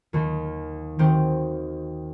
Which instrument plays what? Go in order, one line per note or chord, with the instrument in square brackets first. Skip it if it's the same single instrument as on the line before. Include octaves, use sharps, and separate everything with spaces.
[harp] D#2 D#3
D#3 C4 F#4 G4